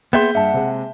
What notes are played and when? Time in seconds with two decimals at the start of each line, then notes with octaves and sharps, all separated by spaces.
0.13 A#3 B3 G#4 E5 C6 G6 B6 E7
0.35 G2 E5 F#5 A5
0.54 C3 G#3